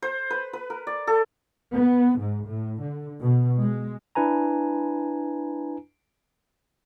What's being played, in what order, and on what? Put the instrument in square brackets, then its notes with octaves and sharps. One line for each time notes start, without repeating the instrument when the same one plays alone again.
[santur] C5
B4
B4
A#4
D5
A4
[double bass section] B3
G#2
A2
D3
B2
G#3
[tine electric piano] D4 E4 B4 G#5 A#5